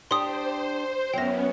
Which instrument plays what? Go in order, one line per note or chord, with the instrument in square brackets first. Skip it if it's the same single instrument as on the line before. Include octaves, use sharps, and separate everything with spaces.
[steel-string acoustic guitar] D4 G4 [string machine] C5 [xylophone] C6 D#6
[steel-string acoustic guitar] F#2 F#3 [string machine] B3 C#4 [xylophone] G5 A#6